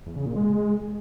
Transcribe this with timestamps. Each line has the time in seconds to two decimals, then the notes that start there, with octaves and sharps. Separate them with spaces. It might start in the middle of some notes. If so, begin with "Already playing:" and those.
0.06 E2
0.16 C#3
0.26 A#2
0.36 G#3